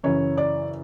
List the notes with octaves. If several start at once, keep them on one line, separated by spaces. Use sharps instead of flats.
F#2 C#3 E3 C#5
D5